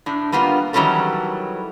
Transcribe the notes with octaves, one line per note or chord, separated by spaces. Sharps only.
A2 D4
G3 A#3 B3 F4 A#4
D#3 E3 F#3 G3 C#4 A4